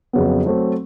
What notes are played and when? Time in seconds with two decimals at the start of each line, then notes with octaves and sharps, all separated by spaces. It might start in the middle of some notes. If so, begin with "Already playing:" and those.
0.13 F2 C#3 F#3 B3
0.46 F#3 A3 C4